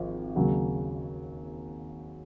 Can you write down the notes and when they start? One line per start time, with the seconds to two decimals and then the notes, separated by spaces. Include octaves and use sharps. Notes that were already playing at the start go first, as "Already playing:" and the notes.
Already playing: G#1 F3
0.36 D#2 C#3 F#3